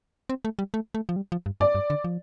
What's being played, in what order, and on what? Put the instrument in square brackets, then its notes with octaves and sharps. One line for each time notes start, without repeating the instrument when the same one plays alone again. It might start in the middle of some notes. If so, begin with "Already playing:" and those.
[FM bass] C4
A3
G3
A3
A3
F3
G3
F3
G2
[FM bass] G2 [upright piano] D5
[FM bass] G2
D3
F3